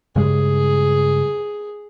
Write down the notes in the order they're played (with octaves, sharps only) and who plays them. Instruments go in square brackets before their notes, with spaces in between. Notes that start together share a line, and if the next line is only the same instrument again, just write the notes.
[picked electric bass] G2 C#3 G#3 [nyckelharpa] G#4